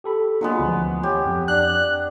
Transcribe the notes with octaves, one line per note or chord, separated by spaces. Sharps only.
G4 A4 B5
F#3 G#3 A#3 B3 D4 F4
D2 E3 F3
G4 C#5
F2
D4 F#6